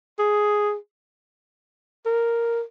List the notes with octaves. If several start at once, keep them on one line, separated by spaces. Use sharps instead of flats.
G#4
A#4